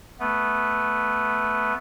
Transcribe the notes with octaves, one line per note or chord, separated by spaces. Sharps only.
A3 B3